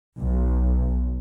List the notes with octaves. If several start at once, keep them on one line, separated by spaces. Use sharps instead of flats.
B1